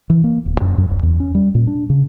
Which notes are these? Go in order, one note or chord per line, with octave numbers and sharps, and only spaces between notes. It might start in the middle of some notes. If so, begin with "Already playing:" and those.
E3
A#3
D1
F#2
F#2
D1
E2
C#4
G3
A#2
D4
C#3